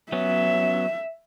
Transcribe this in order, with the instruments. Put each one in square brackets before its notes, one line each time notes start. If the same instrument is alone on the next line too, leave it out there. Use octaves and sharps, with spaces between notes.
[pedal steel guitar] F#3 B3 C#4 [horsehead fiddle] E5